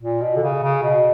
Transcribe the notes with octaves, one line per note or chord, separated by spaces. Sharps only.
A#2
B2
D3
C#3
C#3
B2